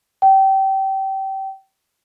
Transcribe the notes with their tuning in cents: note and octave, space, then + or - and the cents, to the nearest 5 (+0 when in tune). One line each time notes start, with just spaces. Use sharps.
G5 -25